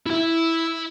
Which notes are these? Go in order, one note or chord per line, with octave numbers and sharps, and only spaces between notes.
E4 E5